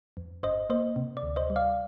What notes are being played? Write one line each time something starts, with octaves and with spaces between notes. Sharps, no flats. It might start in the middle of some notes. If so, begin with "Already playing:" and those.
F2
G1 C5 D#5
A#3 C5 D#5
C3
D5
D2
C5 D#5
G3
D5 F5